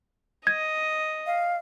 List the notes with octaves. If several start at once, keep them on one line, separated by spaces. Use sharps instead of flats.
D#5 G#6
F5